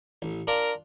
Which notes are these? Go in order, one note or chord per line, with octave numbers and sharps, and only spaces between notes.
A1
D4 F4 A#4